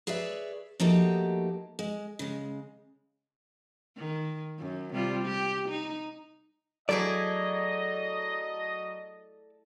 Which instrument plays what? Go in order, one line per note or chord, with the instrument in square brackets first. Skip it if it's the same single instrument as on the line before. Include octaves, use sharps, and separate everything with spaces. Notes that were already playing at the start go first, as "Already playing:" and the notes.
[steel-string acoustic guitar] G#4 B4 C#5 D5 E5
F3 A3 A#3 D#4 F#4 G4
G#3
C#3 G#3
[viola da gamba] D#3
F#2
C3 G3 F4
G4
D#4
[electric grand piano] F#3 [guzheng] A3 E4 G#4 [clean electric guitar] A4 D5 [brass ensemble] D#5